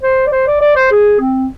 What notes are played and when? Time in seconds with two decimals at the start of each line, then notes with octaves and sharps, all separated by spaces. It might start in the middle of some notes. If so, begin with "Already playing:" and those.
0.03 C5
0.27 D5
0.32 C5
0.47 D5
0.61 D5
0.76 C5
0.91 G#4
1.20 C4